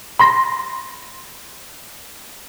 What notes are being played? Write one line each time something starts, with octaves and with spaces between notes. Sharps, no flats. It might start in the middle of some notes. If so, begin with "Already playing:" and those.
B5 C6 A#6